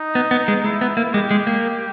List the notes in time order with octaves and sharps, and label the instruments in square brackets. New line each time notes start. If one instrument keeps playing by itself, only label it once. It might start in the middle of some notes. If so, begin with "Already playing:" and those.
Already playing: [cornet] D#4
[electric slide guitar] B3
B3
G#3
[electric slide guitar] G#3 [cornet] E4
[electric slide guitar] B3
A#3
[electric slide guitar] G#3 [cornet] G4
[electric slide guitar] G#3
A#3